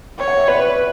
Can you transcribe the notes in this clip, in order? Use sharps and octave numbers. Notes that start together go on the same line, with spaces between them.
C#5 G5
F#5
E5
B4 D5